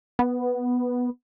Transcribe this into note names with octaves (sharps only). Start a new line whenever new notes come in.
B3